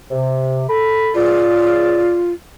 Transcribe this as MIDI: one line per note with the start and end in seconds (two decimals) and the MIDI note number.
0.11 0.63 48
0.69 1.10 69
0.69 1.10 83
1.15 2.18 37
1.15 2.33 65
1.15 2.18 68
1.15 2.18 74